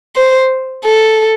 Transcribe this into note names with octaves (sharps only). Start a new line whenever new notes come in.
C5
A4